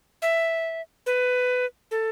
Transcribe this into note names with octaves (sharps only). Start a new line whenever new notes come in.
E5
B4
A4